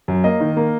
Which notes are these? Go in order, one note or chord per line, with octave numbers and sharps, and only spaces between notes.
F#2
A#3 D#5
D#3
A#3